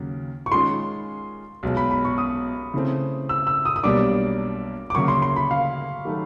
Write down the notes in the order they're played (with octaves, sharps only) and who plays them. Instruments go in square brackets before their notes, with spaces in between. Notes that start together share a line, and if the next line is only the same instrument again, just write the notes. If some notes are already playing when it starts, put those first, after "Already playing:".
Already playing: [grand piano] D#2 C#3 F#3
[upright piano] C#6
[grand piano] D#3 G#3 C#4 F4 G#4 [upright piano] C6
[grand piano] B1 B2 G#3
[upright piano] B5
B5
C#6
D#6
[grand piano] C#3 E3 A3 C4
[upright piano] E6
E6
D#6
D#6
[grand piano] B1 B2 G3 A#3 D4 [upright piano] D6
[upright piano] D6
[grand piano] D2 C#3 F#3 A#3 [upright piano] C#6
[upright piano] C6
C6
B5
F5
[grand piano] D#3 F#3 A3